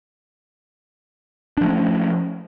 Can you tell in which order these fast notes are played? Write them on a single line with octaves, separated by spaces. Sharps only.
D4 F3 A3 C#4